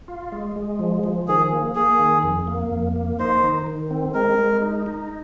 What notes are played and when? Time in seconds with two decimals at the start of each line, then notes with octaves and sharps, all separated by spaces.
0.08 F4
0.32 G#3
0.56 G#3
0.79 F3
1.04 F3
1.28 D#3 G#4
1.52 A#3
1.75 A#3 G#4
1.99 D#3
2.23 F2
2.47 A#3
2.71 F2
2.96 A#3
3.20 D#4 C5
3.43 D#3
3.66 D#3
3.91 C4
4.14 G#3 A#4
4.39 G#3
4.62 D#4
4.86 D#4